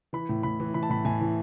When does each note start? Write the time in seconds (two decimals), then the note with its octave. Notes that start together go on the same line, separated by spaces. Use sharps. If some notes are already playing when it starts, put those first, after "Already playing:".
0.13 E3 B5
0.29 A2
0.43 A2 B5
0.60 E3
0.74 E3 B5
0.83 A5
0.90 A2 B5
1.05 A2 G#5
1.21 E3